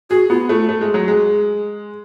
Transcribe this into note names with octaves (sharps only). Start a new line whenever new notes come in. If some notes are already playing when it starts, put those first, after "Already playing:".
F#4 G#4
B3 F4
A3 F4
A3
G#3
F#3
G#3